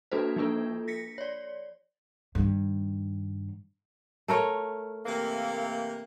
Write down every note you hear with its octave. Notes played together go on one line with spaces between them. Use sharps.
A#3 D4 F#4 A4 B4 C5
F3 A#3 D4 F4 A4
A#6 B6 C#7
C#5 D5
G2 D#3
A3 A#4 C#5
C3 E3 A#3